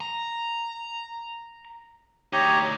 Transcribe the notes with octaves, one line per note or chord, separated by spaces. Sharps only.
A#5
D2 D#4 G4 C#5 A#5